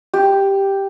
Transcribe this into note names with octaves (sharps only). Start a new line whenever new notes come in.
G4